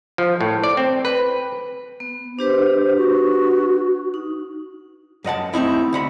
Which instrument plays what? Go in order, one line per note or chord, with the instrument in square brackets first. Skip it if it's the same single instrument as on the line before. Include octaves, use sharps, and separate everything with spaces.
[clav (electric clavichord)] F3
A2
D5
C4
B4
[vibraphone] B3
[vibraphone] D4 G4 B4 [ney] C5
[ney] F#4
[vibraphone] D#4
[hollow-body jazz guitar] F#2 D#5 F#5 A5
A3 C4 D#4 E4
D2 F#5 B5